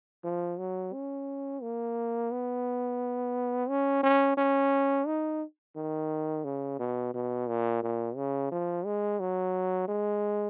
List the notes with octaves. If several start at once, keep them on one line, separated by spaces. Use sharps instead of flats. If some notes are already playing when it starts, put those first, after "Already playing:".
F3
F#3
C#4
A#3
B3
C#4
C#4
C#4
D#4
D#3
C#3
B2
B2
A#2
A#2
C#3
F3
G#3
F#3
G#3